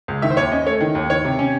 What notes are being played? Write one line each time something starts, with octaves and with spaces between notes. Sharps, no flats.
C#2
D#3 E5
C5
D#2 C#5
C#4 D#5
A3 C#5
D#3
D#2
D#3 C#5
C3
C#4